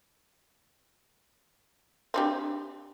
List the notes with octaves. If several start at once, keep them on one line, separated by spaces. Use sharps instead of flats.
C4 D4 G4